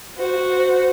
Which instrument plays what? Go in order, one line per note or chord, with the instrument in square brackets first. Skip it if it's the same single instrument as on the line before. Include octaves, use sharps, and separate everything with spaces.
[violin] F#4 C5